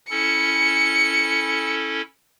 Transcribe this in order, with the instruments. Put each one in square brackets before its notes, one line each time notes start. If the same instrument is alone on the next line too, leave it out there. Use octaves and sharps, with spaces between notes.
[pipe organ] C#4 E4 A4 [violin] C#7